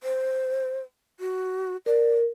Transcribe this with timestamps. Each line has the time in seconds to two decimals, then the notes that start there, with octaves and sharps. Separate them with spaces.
0.03 C5
1.20 F#4
1.86 A#4 D5